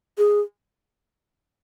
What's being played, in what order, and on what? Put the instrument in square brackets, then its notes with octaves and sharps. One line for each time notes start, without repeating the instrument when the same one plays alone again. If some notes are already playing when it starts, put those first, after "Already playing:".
[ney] G#4